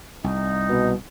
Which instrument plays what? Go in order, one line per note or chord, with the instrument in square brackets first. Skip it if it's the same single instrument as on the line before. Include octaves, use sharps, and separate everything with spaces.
[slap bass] C2 [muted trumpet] D#4
[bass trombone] B2